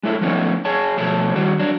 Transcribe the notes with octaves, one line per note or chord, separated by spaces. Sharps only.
G#3 E4 A4
F3 A3 B3 C#4 D#4
G#4 C#5 A5
B2 F3 A3 C#5 A5
D#3 G3 F#4
F#3 D4